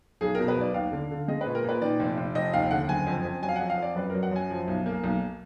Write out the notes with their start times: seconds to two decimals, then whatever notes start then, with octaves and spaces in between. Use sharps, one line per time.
0.21 B1 G#4
0.35 B2 A#4
0.48 B4
0.56 B1 D5
0.74 D#2 F5
0.92 D3
1.11 D3
1.28 G#3 D#5
1.41 A#2 B4
1.55 A#4
1.64 A#2 B4
1.82 D#3 D5
2.00 F1
2.18 F1
2.35 F1 D#5
2.53 D#2 F5
2.71 D3 F#5
2.89 F#1 G#5
3.07 F2
3.25 F2
3.42 F#3 G#5
3.49 F5
3.56 F2 F#5
3.70 F5
3.78 F2 D5
3.95 F#2 B4
4.10 F#3 A#4
4.23 F#5
4.31 F#2 G#5
4.50 F3
4.68 B1
4.86 A#3
5.04 B1